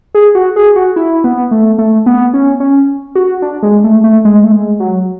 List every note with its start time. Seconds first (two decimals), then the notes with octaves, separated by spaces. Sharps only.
0.15 G#4
0.35 F#4
0.56 G#4
0.76 F#4
0.96 E4
1.24 B3
1.51 A3
1.79 A3
2.06 B3
2.34 C#4
2.60 C#4
3.15 F#4
3.42 D4
3.63 G#3
3.84 A3
4.04 A3
4.25 G#3
4.44 A3
4.52 G#3
4.80 F#3